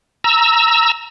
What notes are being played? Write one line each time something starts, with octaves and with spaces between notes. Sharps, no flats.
A#5 E6